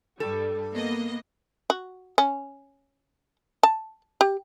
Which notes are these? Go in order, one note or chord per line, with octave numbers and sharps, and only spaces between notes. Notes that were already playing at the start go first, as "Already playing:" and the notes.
G2 G3 A4
A#3 B3 D#5
F#4
C#4
A5
G4